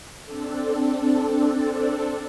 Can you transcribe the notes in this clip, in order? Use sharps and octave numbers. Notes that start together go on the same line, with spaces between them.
C4 D4 A4